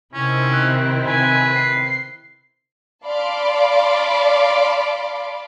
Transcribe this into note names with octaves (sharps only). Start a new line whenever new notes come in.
C3 D#3 C4 C#4 E4
F#6
C3 B4 G#5
C7
D5 F5 A5 B5 C6 D6